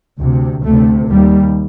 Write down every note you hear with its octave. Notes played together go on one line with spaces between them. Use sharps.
D2 C3
D2 C3 A3
D#2 G3